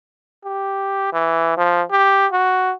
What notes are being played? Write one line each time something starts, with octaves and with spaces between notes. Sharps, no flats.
G4
E3
F3
G4
F#4